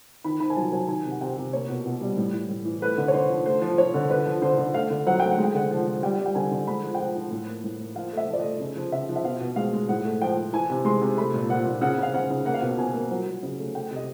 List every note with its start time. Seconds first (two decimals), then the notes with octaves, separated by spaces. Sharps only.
0.24 D#3 B5
0.40 D#3 B5
0.50 G#5
0.56 F#3 A5
0.72 F#3 G#5
0.88 D#3 G#5
1.05 C3
1.11 F#5
1.21 C3 G5
1.37 C3
1.53 A#3 C#5
1.69 B2
1.86 B2
2.01 G3
2.17 A2
2.33 E3
2.49 A2
2.65 E3
2.82 A3 B4
2.98 D3
3.08 C#5
3.14 D3 C5
3.30 F3
3.45 A3 C5
3.62 F3
3.70 C5
3.78 F3 C#5
3.94 D3
4.10 D3 B4
4.26 F3
4.42 D3 C5
4.58 D3
4.74 A3 F5
4.90 D3
5.07 F#3 F#5
5.20 A3 G5
5.31 F#5
5.38 G#3
5.44 G5
5.54 D3 F#5
5.71 F3
5.87 F3
6.03 G3 G5
6.18 G3
6.26 G5
6.35 D3 G#5
6.51 D3
6.67 G#3 B5
6.83 F3
6.95 G5
6.99 F3 F#5
7.15 F3
7.31 A2
7.47 A#3
7.64 A2
7.80 A#3
7.95 F3 F5
8.13 A3 E5
8.28 F3
8.33 D5
8.39 A3 D#5
8.60 C#3
8.76 F3
8.92 C#3 E5
9.09 F3
9.16 E5
9.24 B2 F5
9.40 B2
9.56 G#3 F5
9.73 G#3
9.89 A2 F#5
10.05 A3
10.21 F3 G5
10.37 F3
10.53 E3 G#5
10.70 C3
10.85 G#3 C6
11.01 C3
11.17 A3 B5
11.34 A#2
11.49 A#2 F#5
11.66 A#2
11.81 C#3 F#5
11.98 C#3
12.03 F5
12.14 C#3 F#5
12.30 C#3
12.45 A#3 F#5
12.54 F5
12.60 B2 F#5
12.78 B2 G#5
12.94 A#3
13.11 F#3
13.26 F#3
13.43 C#3
13.58 A3
13.75 A3 G5
13.91 C3
13.96 D#5